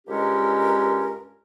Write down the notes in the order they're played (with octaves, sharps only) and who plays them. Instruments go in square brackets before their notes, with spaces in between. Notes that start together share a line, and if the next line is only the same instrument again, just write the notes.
[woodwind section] C#2 G2 G#3 C#4 G4 A#4